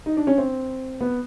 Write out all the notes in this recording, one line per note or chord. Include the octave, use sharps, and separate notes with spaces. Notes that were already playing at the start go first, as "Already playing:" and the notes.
D#4
D4
C#4
C4
B3